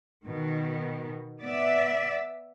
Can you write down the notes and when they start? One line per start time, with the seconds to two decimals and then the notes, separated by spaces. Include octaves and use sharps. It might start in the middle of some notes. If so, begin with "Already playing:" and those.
0.25 B2 D#3
1.41 B3 D5 E5